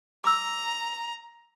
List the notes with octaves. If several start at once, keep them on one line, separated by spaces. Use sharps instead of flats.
A#5 D6 E6